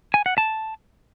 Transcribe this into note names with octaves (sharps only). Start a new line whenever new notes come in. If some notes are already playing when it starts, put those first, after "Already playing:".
G#5
F#5
A5